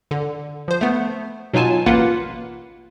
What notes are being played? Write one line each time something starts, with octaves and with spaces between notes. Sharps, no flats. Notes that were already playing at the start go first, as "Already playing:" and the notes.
D3
F3 C5
A3 B3
B2 F#3 D#4 F4 G#5 A5
A1 A#3 F4 B4 F#5